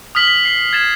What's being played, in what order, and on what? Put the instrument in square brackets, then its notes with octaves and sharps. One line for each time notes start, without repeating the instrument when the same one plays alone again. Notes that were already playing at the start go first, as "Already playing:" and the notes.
[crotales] D#6 F6 B6 F#7
B6
C7
G#6 A6 C7 E7